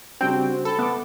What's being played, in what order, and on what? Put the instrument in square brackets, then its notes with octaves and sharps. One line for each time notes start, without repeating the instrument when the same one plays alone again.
[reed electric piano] C#3 G3 D4 [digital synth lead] C4 [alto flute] F#4 [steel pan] G5
[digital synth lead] A4 [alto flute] B5
[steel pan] B3 [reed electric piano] E5 A5 D6